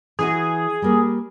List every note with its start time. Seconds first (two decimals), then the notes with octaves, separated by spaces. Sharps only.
0.19 E3 E4 F#4 G#4
0.82 G3 A#3